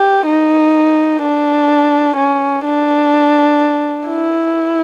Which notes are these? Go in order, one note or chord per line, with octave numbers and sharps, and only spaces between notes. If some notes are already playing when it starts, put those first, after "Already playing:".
Already playing: G4
D#4
D4
C#4
D4
E4